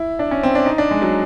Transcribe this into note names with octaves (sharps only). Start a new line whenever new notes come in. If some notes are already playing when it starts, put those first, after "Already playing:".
Already playing: E4
D4
C#4
C4
D4
D#4
D4
G#3
F#3